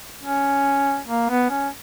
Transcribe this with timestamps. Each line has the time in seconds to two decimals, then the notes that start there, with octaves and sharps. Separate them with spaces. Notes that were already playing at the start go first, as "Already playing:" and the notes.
0.22 C#4
1.08 A#3
1.29 B3
1.50 C#4